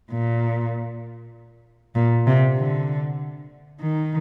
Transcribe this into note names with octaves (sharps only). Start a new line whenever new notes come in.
A#2
A#2
C3
D3
D#3